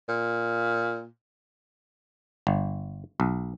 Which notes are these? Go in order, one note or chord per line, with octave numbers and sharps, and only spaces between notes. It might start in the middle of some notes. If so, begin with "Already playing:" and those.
A#2
G1
B1